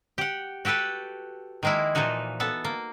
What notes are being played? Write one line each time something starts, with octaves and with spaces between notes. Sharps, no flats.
G4 F#5
F#4 G4 A4 B4 F#5
D#3 F3 G#3 A#3 E4
A#2 E3 F3 D#4 F#4
B3 A4
A#3